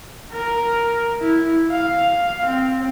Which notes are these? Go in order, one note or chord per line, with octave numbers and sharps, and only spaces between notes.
A#4
E4
F5
C4